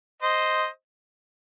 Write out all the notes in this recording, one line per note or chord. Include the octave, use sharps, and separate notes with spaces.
C5 D#5